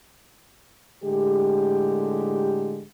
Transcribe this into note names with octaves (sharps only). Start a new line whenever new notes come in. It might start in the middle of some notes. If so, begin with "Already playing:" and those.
A2 D3 G#3 G4